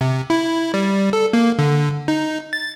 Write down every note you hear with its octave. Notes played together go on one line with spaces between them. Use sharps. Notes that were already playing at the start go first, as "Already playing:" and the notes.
C3
E4
G3
A4
A#3
D3
D#4
A6